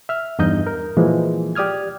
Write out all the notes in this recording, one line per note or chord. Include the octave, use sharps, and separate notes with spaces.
E5 F6
E2 G2 D#4 D#5 G6
A#4
A#2 E3 F3 G#3
G4 D5 D#6 F6 G#6